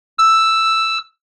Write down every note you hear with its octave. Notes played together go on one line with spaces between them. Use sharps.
E6